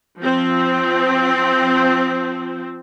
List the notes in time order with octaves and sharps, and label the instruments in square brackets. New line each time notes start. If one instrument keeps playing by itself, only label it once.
[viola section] F3 C4